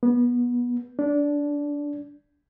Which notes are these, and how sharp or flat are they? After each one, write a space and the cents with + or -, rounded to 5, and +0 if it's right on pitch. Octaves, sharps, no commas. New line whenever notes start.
B3 -25
D4 -15